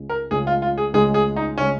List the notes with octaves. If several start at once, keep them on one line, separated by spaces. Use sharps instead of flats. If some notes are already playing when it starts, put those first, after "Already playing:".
Already playing: C#2 C#3 G#3
A#4
C#2 C#3 G#3 G#4
F4
F4
G#4
C#2 C#3 G#3 G#4
G#4
D#4
C#3 G#3 C#4